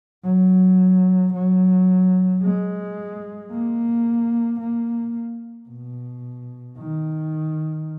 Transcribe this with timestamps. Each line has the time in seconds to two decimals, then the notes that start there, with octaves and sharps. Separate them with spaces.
0.24 F#3
1.33 F#3
2.42 G#3
3.51 A#3
4.60 A#3
5.69 B2
6.78 D#3